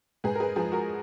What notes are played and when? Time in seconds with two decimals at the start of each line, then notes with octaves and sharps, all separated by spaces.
0.24 G#2 G#4 B4
0.35 A#4
0.40 G#4 B4
0.56 F3 G#4 B4
0.72 F#4 A#4